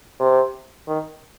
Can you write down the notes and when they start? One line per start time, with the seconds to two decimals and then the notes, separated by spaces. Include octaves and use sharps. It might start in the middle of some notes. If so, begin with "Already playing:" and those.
0.20 C3
0.88 D#3